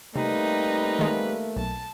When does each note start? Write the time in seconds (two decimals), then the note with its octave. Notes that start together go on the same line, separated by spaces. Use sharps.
0.16 C3 G3 A3 A#3 C4 D#4 B4
0.99 D#3 G#3
1.56 B1 A5